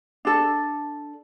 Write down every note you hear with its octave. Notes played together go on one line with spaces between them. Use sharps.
D4 A4